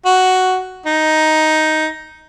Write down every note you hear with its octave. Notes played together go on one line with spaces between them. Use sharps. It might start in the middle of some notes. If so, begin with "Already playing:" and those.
F#4
D#4